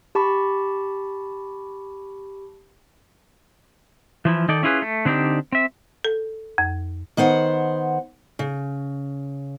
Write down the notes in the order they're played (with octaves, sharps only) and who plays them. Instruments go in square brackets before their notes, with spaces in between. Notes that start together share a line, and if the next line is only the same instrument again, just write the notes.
[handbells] G4 A5 B5 C#6
[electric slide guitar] E3 F3 E4
D#3 D#4 A4 D5
C#4 E4 F4 G#4 B4
A3
D3 C4 D4 D#4 G4
C4 E5
[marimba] A4
F2
[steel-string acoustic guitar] D#3 B3 C5 F#5
C#3